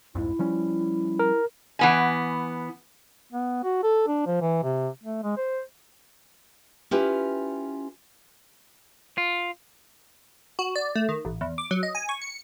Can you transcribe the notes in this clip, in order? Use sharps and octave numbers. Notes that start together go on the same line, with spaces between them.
C2 F2 G#2 E4
F3 G3 C#4
A#4
E3 B3 G#5
B3
F#4
A4
D4
F3
E3
C3
A3
G#3
C5
C#4 E4 F4 G4 B4
F4
F#4
D5
A3
D#3
A1
E2
D6
F#3
D#5
G#5
C#6
C#7